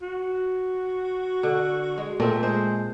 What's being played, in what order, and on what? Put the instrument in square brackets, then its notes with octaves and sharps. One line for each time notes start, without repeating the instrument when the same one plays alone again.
[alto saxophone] F#4
[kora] D3
G#3
[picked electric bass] A#2 [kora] A3 C4 [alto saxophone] A#4
[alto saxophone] G#3 [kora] C5